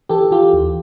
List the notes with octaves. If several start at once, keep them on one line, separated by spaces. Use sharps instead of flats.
E3 G4 A4
E3 F4 G4
D#2